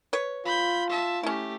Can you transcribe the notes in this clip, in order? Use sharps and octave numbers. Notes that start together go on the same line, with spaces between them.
B4 C#5
F4 B5 G6
E5 A5
A3 C#4 E4 G4